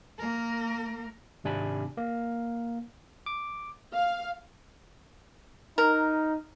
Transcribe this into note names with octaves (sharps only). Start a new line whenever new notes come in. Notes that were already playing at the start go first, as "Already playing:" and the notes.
A#3 A#4
G#1 C3 D4 G#5 B5
A#3
D6
F5
D#4 A#4